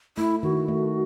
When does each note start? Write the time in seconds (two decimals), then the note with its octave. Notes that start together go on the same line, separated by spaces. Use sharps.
0.18 A3 E4
0.43 D#3 F#4
0.68 A3